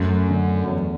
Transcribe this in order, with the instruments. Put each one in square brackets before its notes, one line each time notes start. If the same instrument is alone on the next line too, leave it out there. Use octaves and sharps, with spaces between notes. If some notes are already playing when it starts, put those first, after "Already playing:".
Already playing: [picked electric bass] F#2 [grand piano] A3
[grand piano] D3
E2